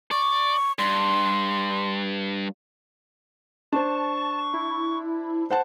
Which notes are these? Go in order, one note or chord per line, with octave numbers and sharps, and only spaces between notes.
D5 C#6
G2 C6
D4 C5 A5 C#6
E4
C5 F#5 A5